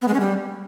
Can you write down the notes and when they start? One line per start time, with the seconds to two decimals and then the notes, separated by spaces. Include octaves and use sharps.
0.02 B3
0.08 G#3
0.14 C#4
0.20 G3